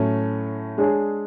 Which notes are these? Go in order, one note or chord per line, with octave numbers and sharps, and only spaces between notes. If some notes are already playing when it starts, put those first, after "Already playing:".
Already playing: A2 F#3 A3 C#4
G#3 D4 G#4 C#5